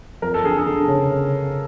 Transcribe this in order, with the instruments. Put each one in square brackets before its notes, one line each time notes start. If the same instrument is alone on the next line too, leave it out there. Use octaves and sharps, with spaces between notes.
[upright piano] F2 [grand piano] A#4
[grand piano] A4
[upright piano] D3 [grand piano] G#4
[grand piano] A4
[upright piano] D3
C#3
C#3